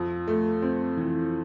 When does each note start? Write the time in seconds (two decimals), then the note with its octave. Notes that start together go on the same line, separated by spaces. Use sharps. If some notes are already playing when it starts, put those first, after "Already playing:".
Already playing: F2
0.28 A3
0.62 C4
0.97 E3